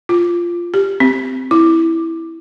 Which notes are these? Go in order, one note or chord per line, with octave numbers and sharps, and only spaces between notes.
F4
G4
C4
E4